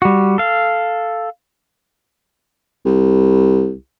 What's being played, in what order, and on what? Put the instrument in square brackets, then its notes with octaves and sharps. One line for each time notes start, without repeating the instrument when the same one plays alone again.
[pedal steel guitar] G3 F#4
A4 F5
[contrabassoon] C2